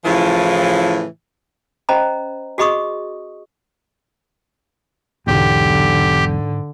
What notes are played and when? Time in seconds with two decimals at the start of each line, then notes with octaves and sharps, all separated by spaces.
0.05 A2 C#3 E3 F3
1.89 C#4 C5 D#5 A#5 B5
2.58 F#4 G#4 D#5 B5 C#6 D#6
5.27 B1 E2 G#2 D3 F#3 G4